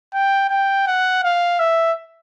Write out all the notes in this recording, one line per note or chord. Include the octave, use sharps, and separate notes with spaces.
G5
G5
F#5
F5
E5